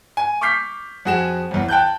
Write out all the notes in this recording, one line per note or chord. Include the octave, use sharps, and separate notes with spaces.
G#5
C#6 D6 F6 G6 B6 C7
F2 F#4 G#4 G#5 E7
A1 E2
G5 A5 F#6 G6